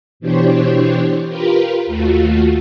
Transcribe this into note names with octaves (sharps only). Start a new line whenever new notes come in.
B2 E3 D4 G4 C5 C#5
F4 G4 A#4 B4
D#2 A3 F4 F#4